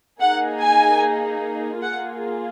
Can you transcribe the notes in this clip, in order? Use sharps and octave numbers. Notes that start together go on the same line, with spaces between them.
A#3 D#4 G#4 F#5
G#5
A#3 F4 G#4 F#5